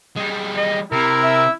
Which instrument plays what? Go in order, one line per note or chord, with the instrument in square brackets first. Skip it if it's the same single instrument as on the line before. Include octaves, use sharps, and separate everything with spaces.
[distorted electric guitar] G3 G#3
[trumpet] D#5
[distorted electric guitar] C3 [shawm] E4 [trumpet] A#4
[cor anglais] E5